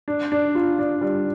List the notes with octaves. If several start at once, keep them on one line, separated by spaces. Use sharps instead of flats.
D4
D4
F4
D4
G3